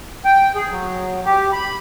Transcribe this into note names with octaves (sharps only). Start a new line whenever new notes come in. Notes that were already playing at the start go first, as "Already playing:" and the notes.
G5
G#4
F#3
G4
B5